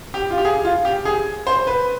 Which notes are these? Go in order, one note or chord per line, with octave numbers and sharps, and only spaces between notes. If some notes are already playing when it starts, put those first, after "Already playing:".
G4
F4
G4
G#4
F4
G4
G#4
C5
B4